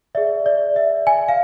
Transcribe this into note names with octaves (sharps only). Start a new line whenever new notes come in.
G#4 D5 E5
D5
E5
G#5
F5